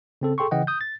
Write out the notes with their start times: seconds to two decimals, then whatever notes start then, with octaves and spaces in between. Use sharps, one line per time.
0.21 C#3 C4 A4
0.38 G#4 A4 G5 C6 C#6
0.51 C#3 E3 D#5 F#5 G5
0.67 D#6 G6
0.81 A6